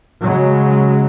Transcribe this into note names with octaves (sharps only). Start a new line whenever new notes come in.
C#3 F#3 G#3